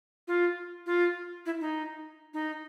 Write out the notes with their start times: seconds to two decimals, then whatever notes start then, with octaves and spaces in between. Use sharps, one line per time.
0.28 F4
0.86 F4
1.46 E4
1.61 D#4
2.34 D#4